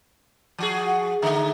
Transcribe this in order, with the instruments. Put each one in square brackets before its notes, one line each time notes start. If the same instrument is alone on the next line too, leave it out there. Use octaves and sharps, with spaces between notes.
[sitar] F3 F#4 G#4
[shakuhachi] F#5
[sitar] D3 A3 D#4 [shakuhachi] E5